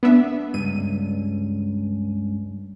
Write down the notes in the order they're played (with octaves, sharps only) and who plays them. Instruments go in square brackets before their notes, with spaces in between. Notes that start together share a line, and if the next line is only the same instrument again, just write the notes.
[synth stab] B3 D4 E5
[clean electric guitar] C#2 G2 [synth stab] D#7